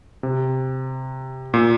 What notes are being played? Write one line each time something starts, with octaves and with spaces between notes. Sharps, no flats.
C3
A#2